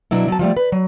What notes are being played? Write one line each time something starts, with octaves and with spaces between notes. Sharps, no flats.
B2 F#3 D4 E4
F#3 A5
F3 G3 A3
B4
F#3